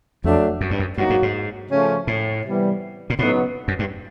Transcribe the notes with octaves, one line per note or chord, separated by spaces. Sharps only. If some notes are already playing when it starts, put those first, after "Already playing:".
F2 F#3 A3 D4
F#2
G2
F#2
G2 F#3 A#3 D#4 F#4
G#2
G#2
C#3 F3 A3 C#4
A2
C3 E3 G3 B3
A#2
A2 C#3 F#3 B3 D#4
F#2
G2